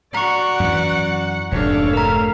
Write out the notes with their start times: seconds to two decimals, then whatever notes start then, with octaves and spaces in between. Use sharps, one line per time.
0.14 F#4 D5 F#5 A#5 C#6
0.60 F#2 E3
1.52 F1 G#2 C3 D4 A4 C#5 F5
1.93 A3 A#4 A#5